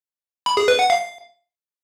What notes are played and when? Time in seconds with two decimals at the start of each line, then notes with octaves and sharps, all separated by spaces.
0.46 B5
0.57 G#4
0.68 B4
0.79 F#5
0.90 F5